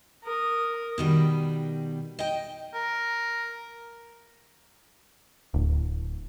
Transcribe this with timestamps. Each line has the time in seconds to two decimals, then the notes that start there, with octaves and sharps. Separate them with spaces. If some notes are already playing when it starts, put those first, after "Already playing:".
0.23 A#4 D#6
0.98 B2 D#3 G3
2.19 D#5 G5
2.74 A#4
5.54 D1